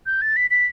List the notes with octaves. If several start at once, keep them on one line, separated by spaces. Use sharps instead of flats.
G6
A6
B6
B6